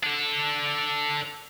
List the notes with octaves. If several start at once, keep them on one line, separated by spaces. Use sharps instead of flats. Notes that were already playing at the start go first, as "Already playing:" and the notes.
D4 A4